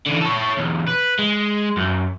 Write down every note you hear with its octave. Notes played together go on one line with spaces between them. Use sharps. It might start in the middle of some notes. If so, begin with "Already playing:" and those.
D3 E3
A4 C#5
B1 E2
B4
G#3
F#2